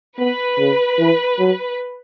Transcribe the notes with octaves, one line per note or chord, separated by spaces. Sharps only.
B3 B4
C#3
E3
F#3